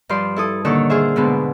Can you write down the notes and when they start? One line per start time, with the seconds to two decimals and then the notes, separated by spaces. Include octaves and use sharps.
0.09 G2 F3 F4 D5 C6
0.36 E4 A4 D#6
0.65 A#2 D3 D#3 A4 C#5 E6
0.90 F4 G#4 C5 E5
1.16 G#2 B2 D3 G#3 B3